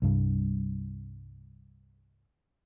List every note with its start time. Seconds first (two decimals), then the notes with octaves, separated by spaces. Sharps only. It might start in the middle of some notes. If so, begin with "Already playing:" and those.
0.02 C2 G2